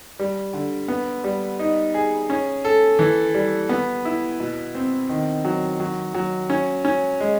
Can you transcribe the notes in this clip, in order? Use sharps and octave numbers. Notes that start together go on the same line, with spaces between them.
G3
D3
B3
G3
D#4
G#4
C#4
A4
E3
G3
B3
E4
B2
C4
D#3
F#3
F#3
F#3
C#4
C#4
G#3